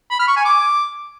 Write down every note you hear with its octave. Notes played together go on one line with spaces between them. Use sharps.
B5
F6
C#6
G#5
D6